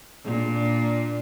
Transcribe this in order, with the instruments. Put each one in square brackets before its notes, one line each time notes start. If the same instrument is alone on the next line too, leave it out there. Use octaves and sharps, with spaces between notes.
[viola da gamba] A#2 D4